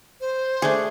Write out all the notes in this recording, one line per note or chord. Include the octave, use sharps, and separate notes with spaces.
C5
A3 D4 G#4